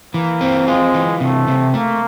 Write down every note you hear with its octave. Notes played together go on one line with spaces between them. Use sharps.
E3 A#3
C4
G#3 F4
E3
C3 A3
C3
A3 A#3